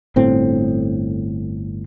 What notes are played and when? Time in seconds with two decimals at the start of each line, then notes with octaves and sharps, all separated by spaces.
0.16 G1 A2 C4